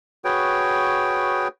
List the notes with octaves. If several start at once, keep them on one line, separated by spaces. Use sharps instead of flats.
F#4 G#4 B4 C#5 G5